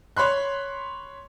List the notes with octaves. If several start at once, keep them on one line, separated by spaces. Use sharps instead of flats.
C#5 B5 C6 F#6